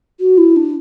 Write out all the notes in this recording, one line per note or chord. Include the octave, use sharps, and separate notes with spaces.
F#4
E4
D4